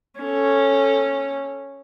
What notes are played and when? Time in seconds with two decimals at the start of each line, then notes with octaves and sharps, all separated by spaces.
0.20 C#4 A4